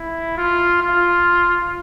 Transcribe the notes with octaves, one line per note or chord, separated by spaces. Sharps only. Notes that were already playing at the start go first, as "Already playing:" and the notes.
Already playing: E4
F4
F4